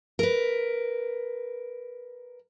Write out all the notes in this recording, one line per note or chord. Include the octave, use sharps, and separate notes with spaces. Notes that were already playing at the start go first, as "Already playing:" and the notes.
A#4 B4